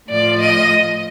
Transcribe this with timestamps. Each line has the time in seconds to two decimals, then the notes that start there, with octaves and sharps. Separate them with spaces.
0.09 A2 F3 D5
0.40 D#5